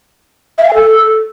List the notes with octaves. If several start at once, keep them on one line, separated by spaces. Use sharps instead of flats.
E5
F5
G#5
A4